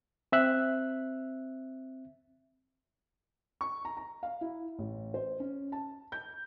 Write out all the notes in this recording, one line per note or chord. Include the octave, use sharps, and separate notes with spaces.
C4 E5 F#6
C#6
A#5
A#5
F5
E4
A1
C5
C#4
A5
G6